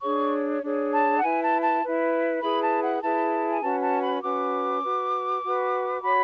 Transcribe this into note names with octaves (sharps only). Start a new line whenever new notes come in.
D4 G#4 C#5 C#6
D4 G#4 C#5
A5
F#5
E4 B4 G#5
A5
A5
E4 B4
E4 G#4 B4 B5
A5
F#5
E4 G#4 B4 A5
G#5
C#4 F#4 B4 A5
A5
B5
C#4 F#4 B4 D6
F#4 B4
F#4 B4
F#4 C#5 B5